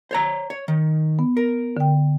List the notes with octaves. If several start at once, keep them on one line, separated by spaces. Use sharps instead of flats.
C5 C#5 A#5
C#5
D#3
B3
A#4
D3 G5